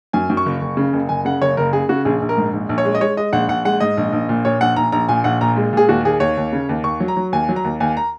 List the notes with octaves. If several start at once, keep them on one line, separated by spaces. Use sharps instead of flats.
F#2 G#5
F#2
C#6
F#1
F#1
C#3
F#1
F#1 G#5
C#3 F#5
F#1 C#5
F#1 A#4
C#3 G#4
C#3 F#4
A#1 G#4
A#1
A#4
G#2
A#1
A#1
C#5
G#3
D#5
G#3 C#5
G#3 D#5
A#1 F#5
A#1 F#5
G#3 F#5
G#2 D#5
A#1
A#1
A#2
A#2 C#5
A#1 F#5
A#1 A#5
A#1 A#5
A#2 G#5
A#1 F#5
A#2 A#5
G#3
A#2 G#4
D#2 F#4
D#2 G#4
D#2 C#5
D#2
C#3
D#2
D#2 C#6
F#3
A#5
F#3
D#2 G#5
F#3
A#5
D#2
D#2 G#5
A#5